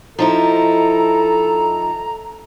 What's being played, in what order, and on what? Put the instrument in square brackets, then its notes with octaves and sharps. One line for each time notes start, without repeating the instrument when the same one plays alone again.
[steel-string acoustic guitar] F3 D#4 E4 [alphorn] A4 [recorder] A#5